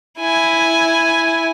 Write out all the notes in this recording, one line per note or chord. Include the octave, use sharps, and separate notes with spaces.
E4 G#5